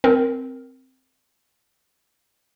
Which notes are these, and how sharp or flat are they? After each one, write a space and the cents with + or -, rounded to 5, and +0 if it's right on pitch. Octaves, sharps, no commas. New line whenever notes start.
C4 +0 A#4 +0